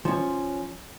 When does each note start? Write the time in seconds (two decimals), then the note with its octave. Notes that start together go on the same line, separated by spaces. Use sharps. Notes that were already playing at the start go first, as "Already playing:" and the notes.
0.05 F3 C#4